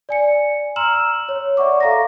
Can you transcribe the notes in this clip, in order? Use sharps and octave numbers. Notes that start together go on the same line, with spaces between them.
D5 G#5 C#7
A#5 C6 E6 F6 E7 F#7
C#5
D5 E5 F#5 C#6 D6
A4 F5 A#5 D6 A#6